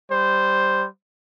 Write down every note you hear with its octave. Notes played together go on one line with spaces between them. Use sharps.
G3 C5